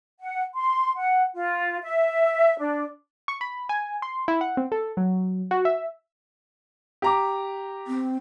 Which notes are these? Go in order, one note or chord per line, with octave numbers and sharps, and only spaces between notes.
F#5
C6
F#5
F4
E5
D4
C#6
B5
G#5
C6
E4
F#5
C4
A4
F#3
F#4
E5
G4 A#5 D6
C4